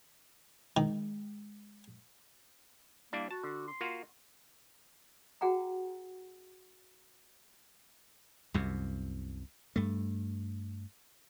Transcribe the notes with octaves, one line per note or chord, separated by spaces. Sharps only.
D#3 G#3
G3 A#3 D4 E4
F#4 A5
D3
C6
A#3 F4 F#4
F#4 G#4 F#5 G5 A#5
C2 F#2 C3
G2 A3